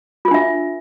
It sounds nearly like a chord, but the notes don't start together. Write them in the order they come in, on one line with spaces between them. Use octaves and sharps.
F4 A#4 D4 E5